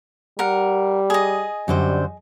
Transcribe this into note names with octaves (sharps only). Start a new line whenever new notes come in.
G3 A#4 F#5
G#4 D#5
F#2 D3 G3 C5